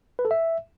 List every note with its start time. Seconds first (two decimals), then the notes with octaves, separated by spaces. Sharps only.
0.19 B4
0.25 A4
0.31 E5